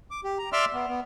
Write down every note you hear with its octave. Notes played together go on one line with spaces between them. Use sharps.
D6
G4
A#5
D5 E5 C6 D6 E6 F6
B3
B3